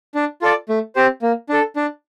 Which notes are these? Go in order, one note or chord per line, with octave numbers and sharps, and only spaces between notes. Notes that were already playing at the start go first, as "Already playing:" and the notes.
D4
F4 A4 D5
A3
C4 G4 C5
A#3
D4 A4
D4